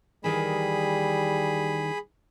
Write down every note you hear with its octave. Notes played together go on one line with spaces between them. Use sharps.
D#2 D#3 E3 G3 G#4 B5